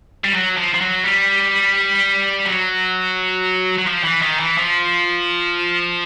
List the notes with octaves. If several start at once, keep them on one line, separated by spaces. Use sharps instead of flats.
G3
F#3
F3
F3
F#3
G3
F#3
F#3
F3
E3
D#3
E3
F3